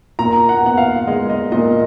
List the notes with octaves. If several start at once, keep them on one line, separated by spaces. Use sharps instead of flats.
A#2 A#5
F#5
B3 F#5
F5
G#3 D#5
D#5
A#2 D#5